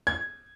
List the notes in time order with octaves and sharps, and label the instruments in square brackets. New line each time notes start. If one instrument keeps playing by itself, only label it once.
[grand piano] G#6